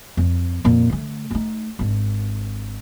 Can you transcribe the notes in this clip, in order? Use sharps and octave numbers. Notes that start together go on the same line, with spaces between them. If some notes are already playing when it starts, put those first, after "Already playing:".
F2
F2 A#2
D3 A3
A3 D#4
G#1 D4